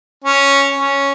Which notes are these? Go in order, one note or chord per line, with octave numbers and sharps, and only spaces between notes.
C#4
C#4